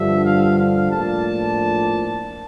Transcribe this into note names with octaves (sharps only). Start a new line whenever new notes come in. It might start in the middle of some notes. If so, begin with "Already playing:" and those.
Already playing: G2 D3 F3 E5
F5
F5
A2 F3 A#3 D4 F4 A5